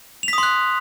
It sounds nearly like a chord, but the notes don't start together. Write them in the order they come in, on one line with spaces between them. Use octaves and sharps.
F7 B6 D#6 C6 F#6